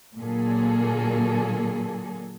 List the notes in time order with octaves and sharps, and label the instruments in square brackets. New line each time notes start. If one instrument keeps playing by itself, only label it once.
[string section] A#2 D3 F#3 A#3 G#4 A4